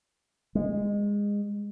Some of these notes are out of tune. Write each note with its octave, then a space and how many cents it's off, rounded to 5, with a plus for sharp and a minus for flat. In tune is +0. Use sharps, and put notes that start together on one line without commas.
G#3 -20